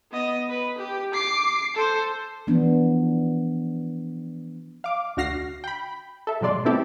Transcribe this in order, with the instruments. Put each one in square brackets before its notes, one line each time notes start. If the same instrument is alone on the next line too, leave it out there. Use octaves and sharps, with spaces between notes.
[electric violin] B3 D#5
B4
G4
D6 C7
A4 C5
[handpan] E3 F3 B3 D4
[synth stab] F5 D6
D2 D3 F#4 F6 A#6 C7
G5 B5
A4 E5
G#2 B2 F#3 G#3 D5 C6
A3 B3 C4 E4 G4 A4